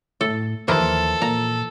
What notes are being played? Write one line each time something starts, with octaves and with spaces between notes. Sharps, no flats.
A2 A4
D#2 E3 F3 A#3 A4
A#2 A#5